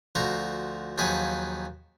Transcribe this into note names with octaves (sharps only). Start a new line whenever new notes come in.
D2 F3 F#4 A#5 C6
D#2 F3 F#3 G#4 B4 F#5